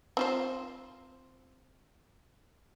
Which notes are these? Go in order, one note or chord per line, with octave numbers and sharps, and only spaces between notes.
C4 F4 C5